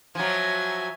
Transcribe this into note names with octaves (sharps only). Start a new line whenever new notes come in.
F3 F#3 E5 G#5